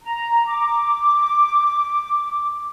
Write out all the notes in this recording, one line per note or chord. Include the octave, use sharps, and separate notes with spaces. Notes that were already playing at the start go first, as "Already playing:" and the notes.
A#5
D6